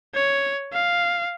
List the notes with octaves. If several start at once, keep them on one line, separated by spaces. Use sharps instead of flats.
C#5
F5